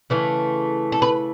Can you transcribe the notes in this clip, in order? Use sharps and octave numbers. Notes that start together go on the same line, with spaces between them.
C#3 E3 A3
A4
B4